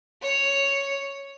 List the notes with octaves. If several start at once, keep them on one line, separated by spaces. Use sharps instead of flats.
C#5